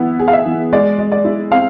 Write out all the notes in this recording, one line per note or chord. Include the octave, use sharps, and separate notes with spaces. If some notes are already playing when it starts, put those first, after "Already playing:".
Already playing: E3 B3 E4
G#4
F5
E5
E3
G#3 D5
G#3
D5
E4
C4 F5